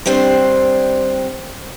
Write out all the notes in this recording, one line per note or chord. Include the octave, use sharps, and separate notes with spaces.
G3 C4 D4 C5